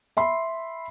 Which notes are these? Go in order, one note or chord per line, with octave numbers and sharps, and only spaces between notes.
E5 B5 C6